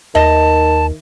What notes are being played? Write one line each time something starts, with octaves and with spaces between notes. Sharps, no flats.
D#2 D#3 D#5 A5